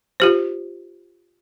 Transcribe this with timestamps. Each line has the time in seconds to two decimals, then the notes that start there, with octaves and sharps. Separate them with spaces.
0.20 F4 G4 C5